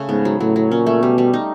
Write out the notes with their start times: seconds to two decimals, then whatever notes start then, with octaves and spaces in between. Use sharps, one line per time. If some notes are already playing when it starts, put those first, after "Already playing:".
Already playing: C#3 A3
0.09 G#2 B3
0.25 F#3
0.40 A2 F#3
0.56 F#3
0.71 A#2 C#4
0.87 A3
1.02 B2 G3
1.18 G3
1.34 D#4